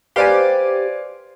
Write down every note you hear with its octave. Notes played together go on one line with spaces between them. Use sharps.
G4 B4 C5 D5 F5 G#5